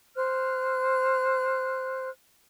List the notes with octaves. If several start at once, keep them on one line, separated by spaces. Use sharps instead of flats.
C5 F6 F#6